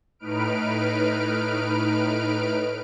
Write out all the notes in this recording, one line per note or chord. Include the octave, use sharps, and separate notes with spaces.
A2 D#4 B4 F6 D7